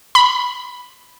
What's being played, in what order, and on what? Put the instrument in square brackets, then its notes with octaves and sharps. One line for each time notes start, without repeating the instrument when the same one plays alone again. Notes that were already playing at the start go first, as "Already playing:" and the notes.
[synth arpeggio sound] B5